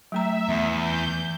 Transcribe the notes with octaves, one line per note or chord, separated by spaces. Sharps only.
F#3 A3 E5 A#5
E2
G6